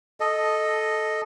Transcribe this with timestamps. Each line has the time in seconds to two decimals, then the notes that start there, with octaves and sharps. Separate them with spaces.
0.20 A4 D#5